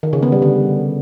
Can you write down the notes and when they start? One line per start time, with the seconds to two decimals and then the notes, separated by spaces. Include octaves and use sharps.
0.03 D#3
0.13 C#3
0.23 B3
0.32 G3
0.42 D3